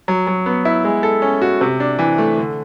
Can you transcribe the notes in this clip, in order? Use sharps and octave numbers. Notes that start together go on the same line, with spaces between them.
F#3
F#3
B3
E4
G#3
A4
C#4
F#4
C3
D4
E3
A3
D3